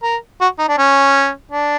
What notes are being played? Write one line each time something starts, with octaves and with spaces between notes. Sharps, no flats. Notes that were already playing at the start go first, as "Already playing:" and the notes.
A#4
F#4
D#4
D4
C#4
D4